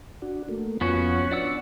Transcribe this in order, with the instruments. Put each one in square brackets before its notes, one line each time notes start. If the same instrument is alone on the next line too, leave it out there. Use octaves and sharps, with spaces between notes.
[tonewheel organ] D4 F#4
A3 A#3
[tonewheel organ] F2 F4 C#5 [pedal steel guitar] B3 C#4 F#4
[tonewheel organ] D4 [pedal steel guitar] D5 F#5 E6